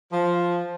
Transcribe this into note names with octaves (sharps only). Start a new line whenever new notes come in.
F3